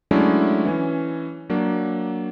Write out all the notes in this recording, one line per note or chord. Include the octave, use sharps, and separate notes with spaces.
F#3 G#3 A3 C#4 D4 E4
E3 C#4
F#3 A#3 D4